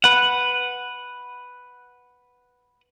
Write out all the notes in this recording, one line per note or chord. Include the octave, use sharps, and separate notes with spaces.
B4 F#5